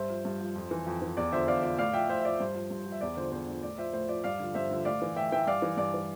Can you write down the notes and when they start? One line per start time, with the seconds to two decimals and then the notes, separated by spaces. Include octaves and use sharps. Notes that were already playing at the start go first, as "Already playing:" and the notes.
Already playing: G2 C5 E5
0.10 F3
0.25 G2
0.41 F3
0.56 F2
0.71 E3
0.87 F2
1.02 E3
1.17 E2 D5
1.32 D3 F3 C5 E5
1.48 E2 D5 F5
1.63 D3 F3 D5
1.78 A2 D5 F5
1.93 F3 E5 G5
2.09 A2 C5 E5
2.20 E5
2.24 F3 D5
2.40 G2 C5
2.55 F3
2.70 G2
2.86 F3
2.92 E5
3.01 E2 D5
3.17 D3 F3 C5
3.31 E2 C5
3.48 D3 F3
3.62 A2 D5
3.78 F3 C5 E5
3.93 A2 C5
4.08 F3 D5
4.24 G2 D5 F5
4.40 D3 F3
4.54 G2 C5 E5
4.71 D3 F3
4.85 A2 D5 F5
5.02 E3
5.16 A2 E5 G5
5.32 E3 E5 G5
5.47 G2 D5 F5
5.62 E3
5.77 G2 D5
5.94 E3